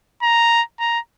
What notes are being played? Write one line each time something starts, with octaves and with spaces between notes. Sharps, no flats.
A#5
A#5